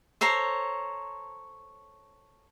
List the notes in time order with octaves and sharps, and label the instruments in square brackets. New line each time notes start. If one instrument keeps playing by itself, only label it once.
[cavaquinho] A4 C5 C#5 A#5